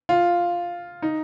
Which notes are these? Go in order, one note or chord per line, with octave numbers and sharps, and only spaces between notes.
F4
D#4